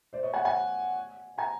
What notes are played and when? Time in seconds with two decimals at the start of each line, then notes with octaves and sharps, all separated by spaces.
0.13 C5 D5
0.23 C#5 D#5
0.34 F#5 G#5
0.45 F#5 G#5
1.38 G#5 A#5